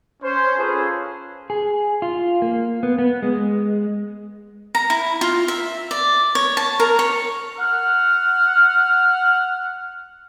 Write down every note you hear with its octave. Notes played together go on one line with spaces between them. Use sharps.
C#4 C5
C#4 F4 G#4 A4 B4
G#4
F4
A#3
B3
B3
G#3
A#5
E4
F4
E5
D5
C#5
A5
A#4
C#5
F#5 F6